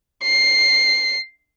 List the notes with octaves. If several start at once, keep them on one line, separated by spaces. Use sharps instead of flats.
C7